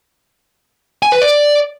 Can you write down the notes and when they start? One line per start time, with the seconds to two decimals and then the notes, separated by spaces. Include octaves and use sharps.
1.03 G#5
1.12 B4
1.22 D5